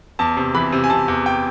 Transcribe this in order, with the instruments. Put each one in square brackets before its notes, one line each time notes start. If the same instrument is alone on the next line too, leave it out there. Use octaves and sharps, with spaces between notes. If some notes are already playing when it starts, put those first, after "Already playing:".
[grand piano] E2 A5
C3
E3 B5
C3
G#5
C3 A5
E2
G5